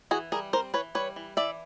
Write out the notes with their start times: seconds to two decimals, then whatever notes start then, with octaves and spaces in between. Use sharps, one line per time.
0.11 E3 F#4 G#4
0.32 G3 G#4 A#4
0.53 C4 A#4 C5
0.74 E3 B4 C#5
0.95 G3 B4 C#5
1.16 E3
1.37 E3 D5 E5